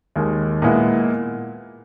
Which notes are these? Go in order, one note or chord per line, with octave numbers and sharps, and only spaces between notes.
D#2 D#3 G#3
A#2 G#3 B3 E4